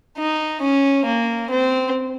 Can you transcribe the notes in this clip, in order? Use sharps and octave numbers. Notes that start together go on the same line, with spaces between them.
D#4
C#4
A#3
C4